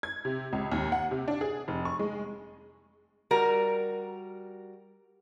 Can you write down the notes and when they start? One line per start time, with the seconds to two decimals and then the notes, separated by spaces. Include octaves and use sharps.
0.03 G#6
0.25 C3
0.53 C#2
0.72 D#2
0.92 F#5
1.11 C3
1.28 D4
1.41 G#4
1.68 F1
1.85 C#6
1.99 G#3
3.31 G3 F#4 A#4